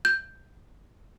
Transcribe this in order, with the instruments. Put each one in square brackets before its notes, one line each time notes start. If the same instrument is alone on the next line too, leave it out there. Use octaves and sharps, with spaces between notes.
[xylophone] G6